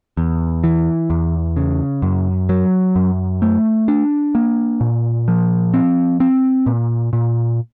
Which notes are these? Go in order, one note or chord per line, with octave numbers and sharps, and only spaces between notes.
E2
E3
E2
C#3
F#2
F#3
F#2
A3
D4
A#3
A#2
F3
C4
C4
A#2
A#2